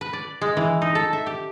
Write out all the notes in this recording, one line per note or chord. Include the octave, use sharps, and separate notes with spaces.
B4
D5
G#3
E3
D#4
A4
E5
G4